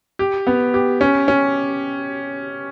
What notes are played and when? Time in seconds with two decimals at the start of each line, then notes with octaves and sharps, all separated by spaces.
0.19 G4
0.47 B3
0.74 G4
1.01 C#4
1.28 C#4